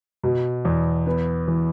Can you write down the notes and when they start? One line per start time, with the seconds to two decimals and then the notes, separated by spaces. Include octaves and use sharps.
0.24 B2
0.65 E2
1.06 B3
1.48 E3